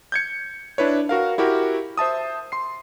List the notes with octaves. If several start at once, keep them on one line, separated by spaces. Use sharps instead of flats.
G6 G#6 C#7
D4 E4 B4 C#5
F#4 A#4 F5
E4 F#4 G4 A#4
C5 E5 A5 D#6
C6 C7